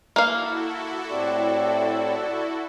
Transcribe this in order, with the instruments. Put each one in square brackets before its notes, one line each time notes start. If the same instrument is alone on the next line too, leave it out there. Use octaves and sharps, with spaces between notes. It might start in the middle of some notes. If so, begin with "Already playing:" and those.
[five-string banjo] A#3 F5 [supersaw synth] E4 F#4 A4
[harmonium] A2 C4 G4 [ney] D5